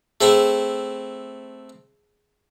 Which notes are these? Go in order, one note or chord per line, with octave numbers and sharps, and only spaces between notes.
A3 C4 E4 G#4